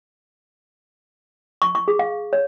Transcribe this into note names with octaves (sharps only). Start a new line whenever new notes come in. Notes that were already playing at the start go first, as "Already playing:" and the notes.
C#6
C#6
G#4
F5
C#5